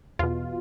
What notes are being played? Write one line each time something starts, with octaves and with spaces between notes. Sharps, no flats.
E2 B2 F4